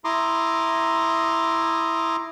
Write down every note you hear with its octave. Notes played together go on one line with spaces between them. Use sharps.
E4 A#5 C6 D6 D#6